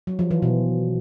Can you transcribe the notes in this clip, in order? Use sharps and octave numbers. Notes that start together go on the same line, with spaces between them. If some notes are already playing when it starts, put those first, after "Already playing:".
F#3
F3
E3
B2